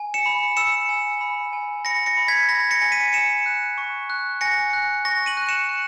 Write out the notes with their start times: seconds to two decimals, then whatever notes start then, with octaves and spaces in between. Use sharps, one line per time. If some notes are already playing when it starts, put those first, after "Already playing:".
Already playing: G#5
0.14 C#7 E7
0.26 B5
0.57 E6 C#7 E7
0.89 G#5
1.21 B5
1.53 G#5
1.85 B5 A#6 C#7
2.06 A#6 C#7
2.17 B5
2.28 G#6 B6
2.49 B5 A#6
2.71 A#6 C#7
2.82 G#5
2.92 B6 D#7
3.13 G#5 C#7 E7
3.46 F#6
3.78 C#6
4.10 F#6
4.41 G#5 A#6 C#7
4.73 F#6
5.05 C#6 A#6
5.26 D#7 F#7
5.37 F#6
5.49 C#7 E7
5.69 F#6